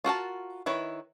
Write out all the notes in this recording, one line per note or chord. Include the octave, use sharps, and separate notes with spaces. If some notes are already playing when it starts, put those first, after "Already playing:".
F4 F#4 A#4 A5
D#3 E4 B4 C#5